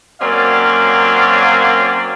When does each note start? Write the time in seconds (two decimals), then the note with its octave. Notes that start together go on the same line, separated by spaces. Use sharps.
0.22 F#3 A#3 C4 C#4 D5 F5